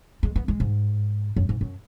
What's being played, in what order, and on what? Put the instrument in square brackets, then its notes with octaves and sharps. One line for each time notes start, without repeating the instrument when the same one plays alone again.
[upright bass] G#3
B3
G#3
G#2
F#2
G#2
F#2